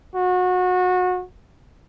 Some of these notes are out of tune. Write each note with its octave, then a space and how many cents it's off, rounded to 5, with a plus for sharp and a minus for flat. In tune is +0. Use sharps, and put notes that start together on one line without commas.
F#4 -25